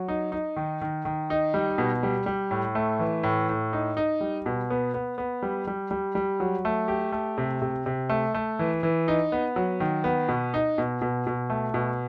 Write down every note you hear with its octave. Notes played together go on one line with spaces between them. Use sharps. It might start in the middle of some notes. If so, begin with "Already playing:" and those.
Already playing: F#3
D#4
D#4
D#3
D#3
D#3
D#4
G3
B2
G3
G3
A2
A3
E3
A2
A2
D#4
D#4
G3
B2
B3
B3
B3
G3
G3
G3
G3
F#3
A3
G4
A3
C3
C3
C3
A3
A3
E3
E3
D#4
B3
F#3
D#3
B3
B2
D#4
B2
B2
B2
A3
B2